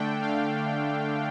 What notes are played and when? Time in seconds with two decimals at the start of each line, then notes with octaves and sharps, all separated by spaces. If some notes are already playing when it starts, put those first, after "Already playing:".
Already playing: D3 A3 D4 G5
0.21 F5